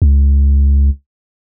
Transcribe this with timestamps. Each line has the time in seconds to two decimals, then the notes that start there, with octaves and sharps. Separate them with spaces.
0.02 C#2